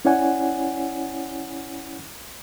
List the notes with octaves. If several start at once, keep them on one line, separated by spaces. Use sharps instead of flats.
C#4 E4 C#5 D5 F#5 G#5